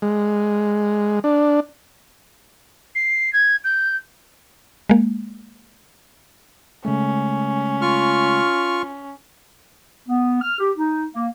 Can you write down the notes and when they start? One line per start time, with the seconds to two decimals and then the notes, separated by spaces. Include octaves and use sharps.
0.02 G#3
1.24 D4
2.95 C7
3.33 G#6
3.64 G6
4.89 G#3 A#3
6.85 C#3 G#3 A3 C#4
7.82 F4 C#6 F6
10.08 B3
10.41 F6
10.59 G4
10.76 D#4
11.14 A#3